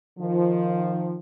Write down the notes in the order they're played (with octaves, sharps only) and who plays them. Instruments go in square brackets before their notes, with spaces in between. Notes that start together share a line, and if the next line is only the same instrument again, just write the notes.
[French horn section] D#3 F3